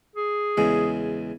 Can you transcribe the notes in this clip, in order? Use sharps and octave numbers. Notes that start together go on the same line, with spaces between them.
G#4
E2 C#3 G#3